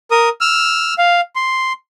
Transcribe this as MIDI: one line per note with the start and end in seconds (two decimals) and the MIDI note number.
0.11 0.29 70
0.11 0.29 87
0.41 0.94 88
0.41 0.94 89
0.98 1.21 77
1.35 1.73 84